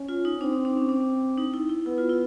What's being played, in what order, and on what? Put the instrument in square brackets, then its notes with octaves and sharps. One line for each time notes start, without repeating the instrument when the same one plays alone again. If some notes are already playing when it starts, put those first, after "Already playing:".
Already playing: [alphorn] C#4
[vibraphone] F4
D#4
[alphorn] C4 [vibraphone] D4
[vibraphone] D#4
D4
C#4
D4
D#4
E4
E4
[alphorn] B3 [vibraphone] E4
[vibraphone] F4
E4